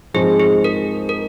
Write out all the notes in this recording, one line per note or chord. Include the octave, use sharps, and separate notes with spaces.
G#2 F3 G#3 C4 G#4
G#4
A#4
A#4